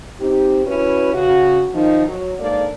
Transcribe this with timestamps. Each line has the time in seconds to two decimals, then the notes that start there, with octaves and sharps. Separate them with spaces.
0.20 C4 D#4 G4
0.66 C#4 E4 F#4 B4
1.14 C#3 F#4
1.75 D#3 F3 D#4
2.08 F#3
2.40 G#2 A#3 D4 A4 D5